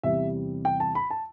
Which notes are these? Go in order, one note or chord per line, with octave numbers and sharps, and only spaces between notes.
E2 C3 G3 E5
G5
A5
B5
A5